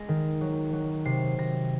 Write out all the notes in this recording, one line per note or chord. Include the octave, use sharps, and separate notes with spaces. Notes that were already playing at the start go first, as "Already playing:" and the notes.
Already playing: G#3 A#6
D#3
F#3
F#3
C3 C7
C3 A#6